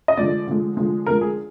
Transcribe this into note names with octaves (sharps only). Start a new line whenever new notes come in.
D#5
D3 F3 G#3 D5
D3 F3 G#3
D3 F3 G#3
D3 F3 G#3 A#4
G#4